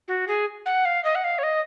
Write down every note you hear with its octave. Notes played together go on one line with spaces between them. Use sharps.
F#4
G#4
F#5
F5
D#5
F#5
F5
C#5
D#5